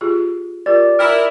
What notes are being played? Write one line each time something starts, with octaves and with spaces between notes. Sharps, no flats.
F4 G4 G#4
F4 G4 A#4 D5
E4 A#4 G5